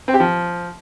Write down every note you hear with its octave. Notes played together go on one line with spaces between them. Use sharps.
C4
G4
F3